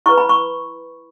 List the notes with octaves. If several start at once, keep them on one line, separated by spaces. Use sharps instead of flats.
E4 B4 C#6
B5
C#6